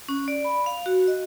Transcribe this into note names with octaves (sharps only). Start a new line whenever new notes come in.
C#4
D5
B5
F5
F#4
D#5